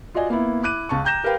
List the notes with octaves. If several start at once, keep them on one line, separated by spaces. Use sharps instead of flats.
F4 F#4 D5 D#5 G#5
A#3 B3 E4
E4 D6 F#6 D#7
C#2 A5 C#6
G5 A#5 G6 A#6 E7
G4 A#4 B4 F5 G5